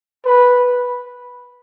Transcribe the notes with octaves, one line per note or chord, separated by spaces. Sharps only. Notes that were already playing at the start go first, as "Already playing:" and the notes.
B4